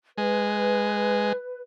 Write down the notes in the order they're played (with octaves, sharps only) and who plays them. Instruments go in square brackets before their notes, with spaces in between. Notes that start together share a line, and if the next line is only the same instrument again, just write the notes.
[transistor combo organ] G#3 [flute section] B4